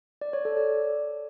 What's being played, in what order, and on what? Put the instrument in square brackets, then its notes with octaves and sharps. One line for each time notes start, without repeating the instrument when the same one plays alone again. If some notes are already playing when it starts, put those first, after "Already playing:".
[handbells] D5
C#5
A4
D5